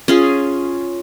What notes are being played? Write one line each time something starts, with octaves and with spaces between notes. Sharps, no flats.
C#4 F4 G#4